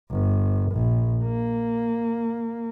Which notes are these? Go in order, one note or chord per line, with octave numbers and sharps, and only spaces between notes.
G1
A#1
A#3